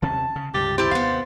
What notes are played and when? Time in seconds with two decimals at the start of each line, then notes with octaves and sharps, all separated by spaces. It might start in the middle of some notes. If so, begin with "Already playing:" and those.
0.02 D#2 C3 C#4 A5
0.36 C#3
0.54 C#2 G2 C3 G4 A6
0.78 E4 G4 C5
0.91 D#2 C3 B3 F5